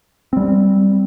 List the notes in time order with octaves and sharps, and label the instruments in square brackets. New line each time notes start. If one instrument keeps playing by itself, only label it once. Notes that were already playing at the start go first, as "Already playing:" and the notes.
[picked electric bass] G3 C4